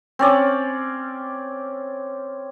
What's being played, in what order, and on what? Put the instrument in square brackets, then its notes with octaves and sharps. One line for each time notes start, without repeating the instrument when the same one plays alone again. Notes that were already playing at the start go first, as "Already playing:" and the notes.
[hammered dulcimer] C4 C#4 D5